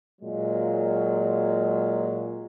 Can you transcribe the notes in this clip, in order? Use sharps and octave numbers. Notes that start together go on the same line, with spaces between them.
A#2 F#3 G#3